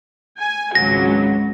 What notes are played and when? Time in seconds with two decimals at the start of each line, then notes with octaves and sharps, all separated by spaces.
0.39 G#5
0.75 G#1 C#2 F#3 A#6